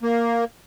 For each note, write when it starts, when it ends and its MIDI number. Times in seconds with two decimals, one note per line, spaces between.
0.03 0.45 58